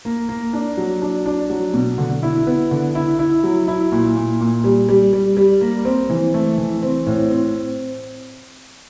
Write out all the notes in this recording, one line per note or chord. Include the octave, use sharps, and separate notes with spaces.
A#3
A#3
D4
F#3
D4
D4
F#3
B2
D3
E4
B3
D3
E4
E4
F#3
E4
A#2
A#2
A#2
G3
G3
G3
G3
A#3
C4
E3
A3
E3
C4
A2
C4